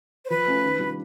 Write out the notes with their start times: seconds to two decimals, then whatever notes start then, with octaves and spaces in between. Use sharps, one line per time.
0.25 C5
0.30 F3 B4
0.46 A3 C#4 F4
0.64 D#3
0.79 G3 B3 D4 F4